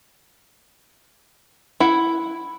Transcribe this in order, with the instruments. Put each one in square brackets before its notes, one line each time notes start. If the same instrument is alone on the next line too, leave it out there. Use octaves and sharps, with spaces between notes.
[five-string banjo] E4 F#5